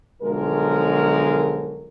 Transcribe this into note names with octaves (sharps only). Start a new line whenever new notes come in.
B1 D3 F3 F#3 G#3 A#4